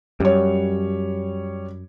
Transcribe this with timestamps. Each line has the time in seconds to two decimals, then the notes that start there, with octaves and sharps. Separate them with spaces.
0.20 F#2 G3 C#5